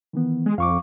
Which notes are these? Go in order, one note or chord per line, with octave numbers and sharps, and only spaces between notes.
D#3 E3 B3
G#3
F2 F5 C#6 D6